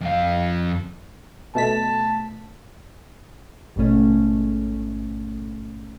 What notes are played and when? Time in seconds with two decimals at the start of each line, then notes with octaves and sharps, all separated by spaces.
0.01 F2 F5
1.55 B2 A3 A5 B6
3.76 A1 G#2 B2 A3 C#4